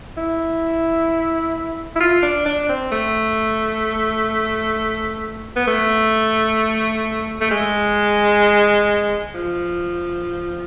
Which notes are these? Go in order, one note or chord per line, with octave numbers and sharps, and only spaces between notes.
E4
E4
F4
D4
D4
C4
A3
B3
A3
A3
G#3
F3